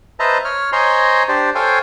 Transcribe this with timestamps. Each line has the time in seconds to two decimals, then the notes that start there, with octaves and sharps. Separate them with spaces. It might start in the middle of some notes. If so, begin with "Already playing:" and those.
0.20 B4 C5 D#5 E5 A5 A#5
0.45 C#5 F6
0.72 C5 C#5 D#5 G#5 A#5 C6
1.28 D4 G4 C5 D5
1.55 A4 C5 C#5 F5 G5 G#5